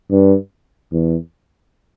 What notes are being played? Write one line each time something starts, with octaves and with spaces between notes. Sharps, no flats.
G2
E2